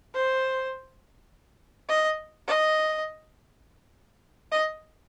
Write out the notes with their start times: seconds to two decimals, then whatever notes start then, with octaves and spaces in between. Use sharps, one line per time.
0.14 C5
1.89 D#5
2.47 D#5
4.52 D#5